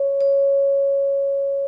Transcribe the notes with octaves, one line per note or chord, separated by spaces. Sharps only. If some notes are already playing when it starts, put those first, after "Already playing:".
Already playing: C#5
C#5